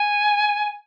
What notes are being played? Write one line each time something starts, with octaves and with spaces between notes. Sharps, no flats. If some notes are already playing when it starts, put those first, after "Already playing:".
Already playing: G#5